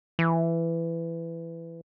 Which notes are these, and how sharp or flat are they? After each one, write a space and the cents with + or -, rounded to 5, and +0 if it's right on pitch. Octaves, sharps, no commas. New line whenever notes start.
E3 +15